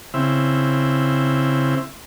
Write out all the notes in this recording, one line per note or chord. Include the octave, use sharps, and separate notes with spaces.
C#3 C4 E4